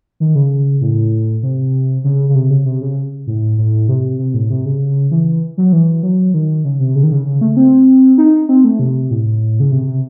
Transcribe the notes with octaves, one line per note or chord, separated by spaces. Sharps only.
D#3
C#3
A2
C3
C#3
C#3
C3
C#3
C3
C#3
A2
A2
C3
C3
A2
C3
C#3
E3
F#3
E3
F#3
D#3
C#3
C3
C#3
D#3
C#3
C#3
A3
C4
D#4
C4
A3
C3
A2
C#3
C3
C3